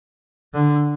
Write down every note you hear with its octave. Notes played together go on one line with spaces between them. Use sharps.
D3